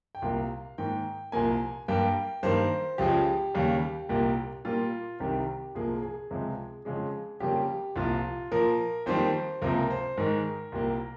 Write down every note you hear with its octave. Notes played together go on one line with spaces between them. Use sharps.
G5
C2 A#2 G3 A#3 F5
G#2 D#3 A#3 G5
C2 A#2 F3 A#3 G#5
G2 G3 A#3 G5
G2 D#3 A#3 C5
C#2 C#3 F3 G#3 G4
D#2 C#3 G3
C2 A#2 G3 A#3
A#2 G3 A#3 F4
C2 C3 D#3 G3 G4
C2 A#2 F3 A#3 G#4
G#4
C#2 C3 F3 G#3
F2 C#3 G#3 G#4
F2 C#3 G3 A#3 G4
C2 A#2 F3 F4
A#2 F3 A#3 A#4
F2 D#3 G3 A#3 C5
C#2 C3 F3 A#3 A#4
C5
G#2 D#3 G#3 A#4
C2 A#2 G3 A#3